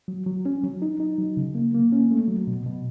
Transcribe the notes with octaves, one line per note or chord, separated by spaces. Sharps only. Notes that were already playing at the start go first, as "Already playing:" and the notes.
F#3
F#3
C#4
F#3
D#4
D#4
F#3
C#3
A#3
A#3
C#4
A3
F#3
B2
B2